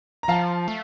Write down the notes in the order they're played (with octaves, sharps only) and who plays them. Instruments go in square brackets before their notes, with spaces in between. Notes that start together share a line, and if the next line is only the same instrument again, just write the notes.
[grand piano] A#5
[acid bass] F3 [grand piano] F5 A5
[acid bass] A3